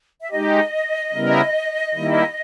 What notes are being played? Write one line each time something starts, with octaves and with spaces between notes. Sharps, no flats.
E5
G#3 D#4 G4 D#5
C#3 G3 B3 E4 A#4
D#3 G3 A#3 E4